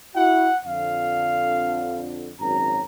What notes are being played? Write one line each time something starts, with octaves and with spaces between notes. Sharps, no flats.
E4 F#4 F#5
F2 D3 F5
G#1 F#2 A#5